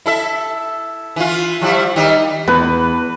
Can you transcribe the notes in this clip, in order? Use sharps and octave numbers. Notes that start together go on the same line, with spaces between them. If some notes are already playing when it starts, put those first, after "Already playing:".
E4 A4 E5
E3 F4
F3 G3 E4
D#3 G3 D#4
E2 B4